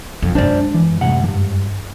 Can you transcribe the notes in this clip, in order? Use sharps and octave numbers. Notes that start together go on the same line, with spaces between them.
F2
F#2 G#3 D4 C5 D5
E3
C2 A2 F#5
G2 E3